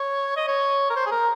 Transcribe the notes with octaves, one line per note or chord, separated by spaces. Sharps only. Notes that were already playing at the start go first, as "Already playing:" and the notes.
Already playing: C#5
D#5
C#5
A#4
C5
G#4
A#4